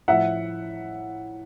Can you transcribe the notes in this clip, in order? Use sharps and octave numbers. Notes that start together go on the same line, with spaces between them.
A2 F3 E5 F#5